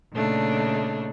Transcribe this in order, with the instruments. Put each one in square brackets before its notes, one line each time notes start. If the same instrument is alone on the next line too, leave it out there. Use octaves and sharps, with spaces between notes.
[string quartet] A#2 C#3 A3 D4 D#4